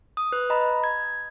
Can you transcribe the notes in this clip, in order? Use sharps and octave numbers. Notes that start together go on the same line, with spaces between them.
D#6
B4 F#6
D#5 A#5 B5
G#6